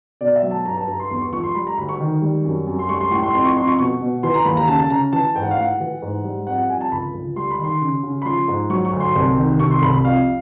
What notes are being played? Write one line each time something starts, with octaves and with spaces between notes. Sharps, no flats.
B2 D5
E5
F#3
A5
G2 A#5
A5
G2 A#5
C6
E2 C6
C#6
F3 C#6
C6
G3 B5
A#5
D2 B5
C#6
D#3
G3
F#2
F#2
C6
G3 C#6
C6
A2 C#6
C6
F2 C6
C#6
F2 C6
C#6
B2 C#6
B2
E3 C6
A#5
D#2 B5
A#5
C#3 A5
A5
C#3 A#5
E3 A5
G#2 G5
F#5
F5
A2 F#5
E3
G#2
G3
F2 F#5
F#5
F2 G#5
A5
C#2 B5
C#2
G3 C6
B5
D#3 C6
C#3
C#3
B5
F3 C6
G#2
F#3 C#6
C#6
D2
C6
C2
D#3
C3 C#6
C6
C2 B5
B5
F2 F5